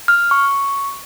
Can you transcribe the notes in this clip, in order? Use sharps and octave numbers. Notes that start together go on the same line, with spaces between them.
F6
C#6